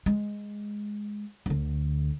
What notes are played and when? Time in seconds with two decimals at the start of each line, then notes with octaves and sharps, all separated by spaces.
0.06 G#3
1.46 D2 D3